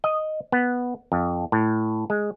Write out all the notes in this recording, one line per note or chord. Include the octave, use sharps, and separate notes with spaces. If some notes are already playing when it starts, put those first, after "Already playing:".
D#5
B3
F2
A2
G#3